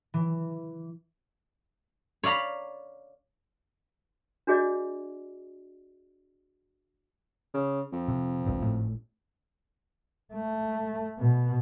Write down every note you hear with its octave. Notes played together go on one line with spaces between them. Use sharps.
E3
C#5 D5 F5 A#5 B5
D4 F#4 G#4 D5 D#5
C#3
F2
C3
G#1 C#2 G2
G#1 A2 A3
A3
B2